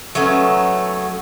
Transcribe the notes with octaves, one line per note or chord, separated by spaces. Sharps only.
F#3 A3 B3 C#4